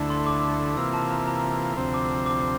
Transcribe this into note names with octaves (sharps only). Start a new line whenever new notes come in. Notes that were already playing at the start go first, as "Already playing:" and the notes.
Already playing: D2 D3 A3 E4
C6
D6
C3 E3 A#3 F4 E6
A5
A#5
A#5
D2 C3 F3 C4
D6
D6